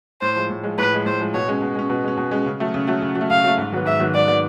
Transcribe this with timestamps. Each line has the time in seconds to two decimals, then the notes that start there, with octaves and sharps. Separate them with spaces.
0.21 A2 C5
0.36 F3 G#3
0.50 A2
0.63 F3 G#3
0.78 A2 B4
0.91 F3 G#3
1.06 A2 C5
1.19 F3 G#3
1.34 B2 C#5
1.48 G#3 C#4
1.62 B2
1.75 G#3 C#4
1.90 B2
2.04 G#3 C#4
2.17 B2
2.31 G#3 C#4
2.46 C#3
2.60 F#3 A3
2.74 C#3
2.87 F#3 A3
3.02 C#3
3.15 F#3
3.21 A3
3.30 C#3 F5
3.44 F#3 A3
3.58 G#2
3.72 D#3 F#3 B3
3.85 G#2 E5
4.00 D#3 F#3 B3
4.14 G#2 D5
4.28 D#3 F#3 B3